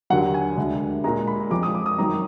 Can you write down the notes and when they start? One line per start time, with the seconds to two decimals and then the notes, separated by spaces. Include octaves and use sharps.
0.10 D#2 D3 F#3 F#5
0.34 G#5
0.57 D2 D3 G#3
1.04 A#2 G#3 A#5
1.27 B5
1.50 F2 F3 G#3 D6
1.63 D#6
1.75 D6
1.86 D#6
1.98 F#2 D#3 F#3 A#5